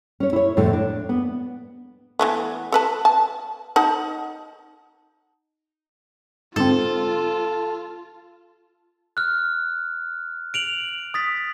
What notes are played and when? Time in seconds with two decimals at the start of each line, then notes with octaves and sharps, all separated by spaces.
0.20 C#4 C#5
0.33 E4 C#5
0.57 F2 A2 D3 A3
0.73 D4
1.09 B3
2.19 E3 A3 B3
2.72 A4 B4 A5
3.05 A5
3.76 D#4 F#5 A5
6.56 G#2 D3 C4 F4 A4
9.17 F6 F#6
10.54 D7 F7 F#7
11.14 D#6 A6 B6